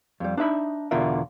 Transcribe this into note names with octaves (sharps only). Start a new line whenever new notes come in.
F2 G3
D4 D#4 E5 B5
E2 B2 D3 F4 A#4 E5